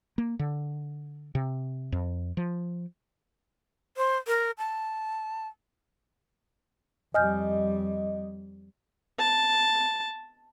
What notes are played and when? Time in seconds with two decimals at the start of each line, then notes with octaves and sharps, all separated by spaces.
0.18 A#3
0.39 D3
1.35 C3
1.92 F2
2.37 F3
3.97 C5
4.28 A#4
4.58 A5
7.14 F2 G3 D#5 G#5 F6 G6
9.19 A5